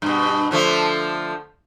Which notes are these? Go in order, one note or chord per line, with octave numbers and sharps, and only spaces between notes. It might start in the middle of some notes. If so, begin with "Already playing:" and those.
G2 B2
D3 F3 A3